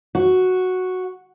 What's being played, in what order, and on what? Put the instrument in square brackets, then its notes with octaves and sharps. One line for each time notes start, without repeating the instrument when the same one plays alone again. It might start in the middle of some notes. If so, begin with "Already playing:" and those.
[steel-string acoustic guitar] F#4